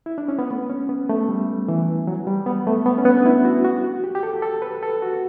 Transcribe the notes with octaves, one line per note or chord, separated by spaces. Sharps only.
E4
D4
C#4
B3
A3
C#4
B3
A3
G3
E3
F#3
G3
B3
A3
B3
C#4
B3
D4
E4
F#4
F#4
F#4
G4
G4
A4
A4
B4
A4
F#4